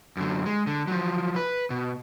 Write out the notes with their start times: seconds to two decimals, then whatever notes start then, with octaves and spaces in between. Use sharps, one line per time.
0.17 F#2 D3
0.46 G#3
0.67 D3
0.87 F3 F#3
1.36 B4
1.70 B2